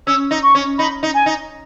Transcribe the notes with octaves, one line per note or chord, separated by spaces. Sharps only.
C#4 E6
D#4
C#6
C#4
D#4 B5
D#4
G#5
D#4